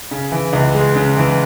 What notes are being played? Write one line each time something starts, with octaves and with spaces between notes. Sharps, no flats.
C#3
E3
C#2
G#3
C#3
E3